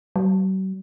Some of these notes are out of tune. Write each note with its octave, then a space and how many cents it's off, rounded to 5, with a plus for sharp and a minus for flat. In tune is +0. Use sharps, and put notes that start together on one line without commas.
F#3 +45